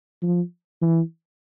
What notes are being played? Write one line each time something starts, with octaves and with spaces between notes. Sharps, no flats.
F3
E3